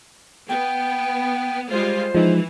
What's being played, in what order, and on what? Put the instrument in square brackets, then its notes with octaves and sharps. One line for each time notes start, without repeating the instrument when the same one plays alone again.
[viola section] B3 [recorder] G5
[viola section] G3 G#3 F4 [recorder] C5
[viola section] E3 [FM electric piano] F3 G#3 D#4